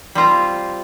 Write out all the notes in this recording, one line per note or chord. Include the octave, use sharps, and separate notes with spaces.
G3 C4 F4 A#5